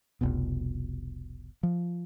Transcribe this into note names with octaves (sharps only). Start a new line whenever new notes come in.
F1 C2 B2
F3